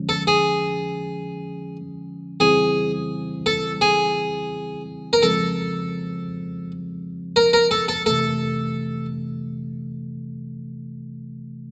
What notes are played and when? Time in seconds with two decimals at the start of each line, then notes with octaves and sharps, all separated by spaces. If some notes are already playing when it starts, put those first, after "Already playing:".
Already playing: D3 F3 G#3 C#4
0.09 A4
0.27 G#4
2.40 C#3 E3 G3 C4 E4 G#4
3.46 A4
3.81 G#4
5.13 A#4
5.23 C#3 F3 G#3 C4 A4
7.36 A#4
7.53 A#4
7.71 A4
7.88 A4
8.06 C3 E3 A3 A4